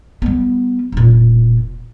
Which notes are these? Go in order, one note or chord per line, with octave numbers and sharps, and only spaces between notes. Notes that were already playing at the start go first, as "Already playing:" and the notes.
G3 B3
E1 A#2